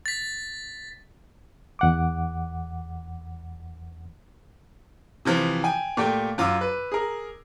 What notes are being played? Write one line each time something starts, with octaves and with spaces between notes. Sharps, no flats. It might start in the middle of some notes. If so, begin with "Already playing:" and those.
A6 B6
E2 F#5 D6
C3 E3 F3
G5 G#5
A#2 A3 G4
F#2 F4 D6 E6
B4
G#4 A#4